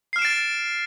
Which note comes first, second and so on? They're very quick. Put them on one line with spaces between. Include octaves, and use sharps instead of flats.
C7 F6 E7 D7 A6